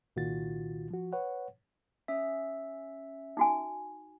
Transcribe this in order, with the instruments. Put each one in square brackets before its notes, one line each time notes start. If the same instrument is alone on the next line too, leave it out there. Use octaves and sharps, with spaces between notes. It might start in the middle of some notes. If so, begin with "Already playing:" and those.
[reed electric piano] C2 A#2 D#3 F4 F#4 A6
F3 F#4
B4 C#5 F#5
[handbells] C#4 E5
[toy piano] D#4 F#4 G#5